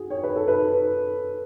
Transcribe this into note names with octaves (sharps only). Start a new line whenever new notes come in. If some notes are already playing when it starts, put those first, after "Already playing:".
Already playing: F#4 G#4
C#5
B4
A4
B4